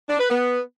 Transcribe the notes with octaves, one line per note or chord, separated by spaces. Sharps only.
D4
B4
B3